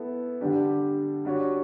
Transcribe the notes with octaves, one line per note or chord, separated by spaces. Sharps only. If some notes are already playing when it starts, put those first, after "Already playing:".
Already playing: B3 E4 A4
D3 G3 D4 G4
G3 D4 F#4 C#5